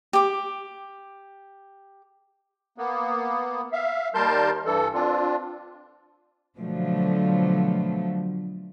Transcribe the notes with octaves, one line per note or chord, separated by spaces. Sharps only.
G4 D6
A#3 B3
E5 F5
D#2 G3 A#4 A5 C6 G6
G2 E3 A4
C4 D4 F4
B2 D3 F3 F#3 A3